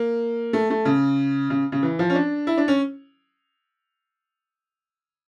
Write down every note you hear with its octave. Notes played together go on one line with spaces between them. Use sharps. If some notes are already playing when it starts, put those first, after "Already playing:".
Already playing: A#3
A3
A3
C#3
C#3
C#3
E3
F3
C#4
D4
E4
D4
C#4